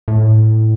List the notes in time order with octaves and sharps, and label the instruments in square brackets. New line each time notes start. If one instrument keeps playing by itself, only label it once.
[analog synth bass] A2